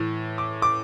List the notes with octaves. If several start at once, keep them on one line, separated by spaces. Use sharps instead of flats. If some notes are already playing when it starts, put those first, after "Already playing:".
Already playing: A2 E3
D6
D6